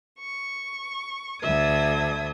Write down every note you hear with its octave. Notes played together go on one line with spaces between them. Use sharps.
C#6
D2 A4 D5 E5 D#6 G#6